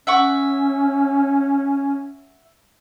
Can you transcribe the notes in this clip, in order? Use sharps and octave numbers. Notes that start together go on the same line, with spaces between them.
C#4 E5 F#5 C#6